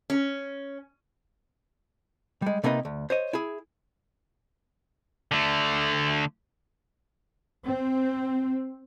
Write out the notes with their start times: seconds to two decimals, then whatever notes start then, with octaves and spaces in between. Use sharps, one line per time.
0.10 C#4
2.42 G3 G#3
2.64 C3 A#3 B3 D#4 G#4 B4
2.85 D2
3.10 C5 C#5 D#5
3.33 E4 G#4
5.32 D3 A3
7.66 C4